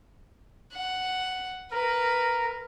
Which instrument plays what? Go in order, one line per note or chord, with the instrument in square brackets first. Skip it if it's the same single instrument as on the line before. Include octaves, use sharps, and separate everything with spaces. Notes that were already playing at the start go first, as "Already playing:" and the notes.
[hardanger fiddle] F#5
[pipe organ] A#4 [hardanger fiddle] B4